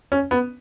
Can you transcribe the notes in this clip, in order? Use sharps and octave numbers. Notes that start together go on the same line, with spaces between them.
C#4
B3